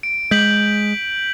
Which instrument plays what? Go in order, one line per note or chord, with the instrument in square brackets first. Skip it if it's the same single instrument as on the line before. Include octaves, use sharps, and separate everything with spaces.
[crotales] D7
[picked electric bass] G#3 [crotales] G6 B6 F#7